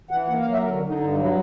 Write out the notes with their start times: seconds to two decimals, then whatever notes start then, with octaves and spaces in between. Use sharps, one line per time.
0.11 E3 F#5
0.28 A#3 F#5
0.41 F5
0.47 F#3
0.53 E5
0.64 D3 A#4
0.76 F#4
0.82 D3
0.88 D#4
0.99 G2 D#4
1.11 D#4
1.17 F#3
1.23 E4